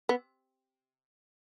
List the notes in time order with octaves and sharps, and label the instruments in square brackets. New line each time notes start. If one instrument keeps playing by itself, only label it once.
[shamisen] B3